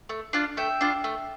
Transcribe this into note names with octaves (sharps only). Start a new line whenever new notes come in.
A3
D4 F4
A3 E5 G5
D4 F4
A3